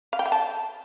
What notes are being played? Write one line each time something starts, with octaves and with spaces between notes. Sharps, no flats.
F5
G5
E5
A5